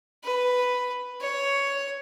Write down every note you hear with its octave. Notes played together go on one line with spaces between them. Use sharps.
B4
C#5